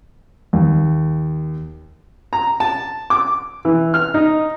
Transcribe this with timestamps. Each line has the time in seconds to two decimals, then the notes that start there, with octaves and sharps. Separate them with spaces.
0.53 D#2
2.33 A#5
2.60 A5
3.10 D6
3.65 E3
3.94 F6
4.14 D#4